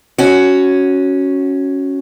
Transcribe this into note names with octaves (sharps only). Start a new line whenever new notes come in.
C#4 F#4